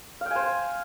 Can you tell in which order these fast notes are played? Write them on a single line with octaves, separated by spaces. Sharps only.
F5 G5 G#5 C5